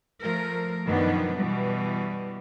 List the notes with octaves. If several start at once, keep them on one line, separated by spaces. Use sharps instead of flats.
F3 A3 A#4
F#2 B2 D#3 F3 B3 D4
B2 E3 G3